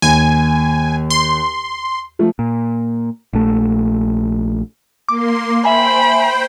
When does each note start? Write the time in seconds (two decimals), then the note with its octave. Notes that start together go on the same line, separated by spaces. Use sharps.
0.02 D#2 G#5
1.10 C6
2.19 F3 A3
2.39 A#2
3.33 A#1 A3
5.08 A#3 C6 D6
5.65 C5 E5 G5 G#5 B5